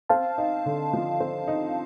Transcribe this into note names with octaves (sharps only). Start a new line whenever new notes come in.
C4 F5 A5
D#4
D3
F3
C4
D#4